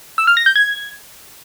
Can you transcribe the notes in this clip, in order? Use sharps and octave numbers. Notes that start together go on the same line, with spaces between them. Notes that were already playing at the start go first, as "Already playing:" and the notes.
E6
F6
A#6
G6
G#6